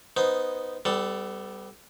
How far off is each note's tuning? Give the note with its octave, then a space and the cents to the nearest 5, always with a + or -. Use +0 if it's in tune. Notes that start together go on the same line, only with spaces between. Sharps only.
B3 +0 D#4 +0 C5 -15
G3 +0 B3 +35 A4 +0